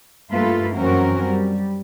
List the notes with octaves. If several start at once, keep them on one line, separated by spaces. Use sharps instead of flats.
G2 A3 A#3 F4 A4 B4
F#2 E3 C4 C#4 F#4 A#4
G3